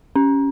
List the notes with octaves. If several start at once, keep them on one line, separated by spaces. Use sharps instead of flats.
C#4